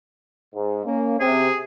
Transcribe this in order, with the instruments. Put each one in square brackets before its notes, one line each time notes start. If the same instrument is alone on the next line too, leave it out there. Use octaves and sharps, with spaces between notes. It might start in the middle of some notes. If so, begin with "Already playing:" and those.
[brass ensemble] G#2
A#3 C#4
[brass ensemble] C3 [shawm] G#4